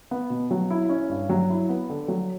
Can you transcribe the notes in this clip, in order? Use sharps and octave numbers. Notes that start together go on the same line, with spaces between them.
B3
B2
F#3
E4
C#4
G2
F#3
E4
B3
D3
F#3